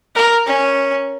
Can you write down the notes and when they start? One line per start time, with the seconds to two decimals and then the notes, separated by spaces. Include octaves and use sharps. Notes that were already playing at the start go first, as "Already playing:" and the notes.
0.16 A#4
0.46 C#4